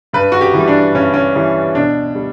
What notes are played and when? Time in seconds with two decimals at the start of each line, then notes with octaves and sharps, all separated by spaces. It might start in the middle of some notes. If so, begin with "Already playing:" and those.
0.13 G2 B4
0.32 F#4
0.41 G4
0.53 E3 G3
0.68 D4
0.94 G2 C#4
1.14 C#4
1.35 E3 G3
1.75 B2 D4
2.15 G3